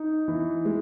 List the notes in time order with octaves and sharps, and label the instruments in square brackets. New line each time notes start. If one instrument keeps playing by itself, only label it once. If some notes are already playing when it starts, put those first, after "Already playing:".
Already playing: [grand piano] D#4
E3
G#3